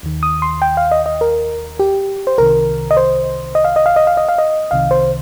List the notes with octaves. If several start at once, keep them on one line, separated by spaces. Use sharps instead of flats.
D#2 D#3
D#6
C6
G5
F5
D#5
D#5
A#4
G4
C5
C2 C3 D#3 A#4
D#5
C5
D#5
F5
D#5
F5
D#5
F5
D#5
F5
D#5
C2 C3 D#3 F5
C5